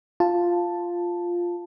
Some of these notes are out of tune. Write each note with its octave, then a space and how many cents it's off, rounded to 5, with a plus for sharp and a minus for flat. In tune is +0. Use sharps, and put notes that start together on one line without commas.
F4 +0 A5 +0